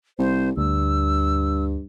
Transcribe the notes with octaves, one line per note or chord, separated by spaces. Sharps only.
C2 C5
D2 G2 E6